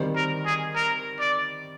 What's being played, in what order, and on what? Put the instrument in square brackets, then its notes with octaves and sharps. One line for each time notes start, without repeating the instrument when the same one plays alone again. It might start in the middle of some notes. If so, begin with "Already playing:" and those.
Already playing: [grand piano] D#3 G3 C4
[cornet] A#4
G#4
A#4
D5